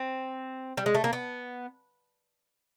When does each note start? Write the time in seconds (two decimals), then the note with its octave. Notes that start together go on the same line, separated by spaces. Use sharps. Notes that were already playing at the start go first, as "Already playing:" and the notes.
Already playing: C4
0.77 G3
0.86 G#3
0.94 A3
1.04 A#3
1.13 B3